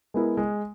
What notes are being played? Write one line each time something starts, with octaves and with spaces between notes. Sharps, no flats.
G#3 B3 E4 A#4
G#3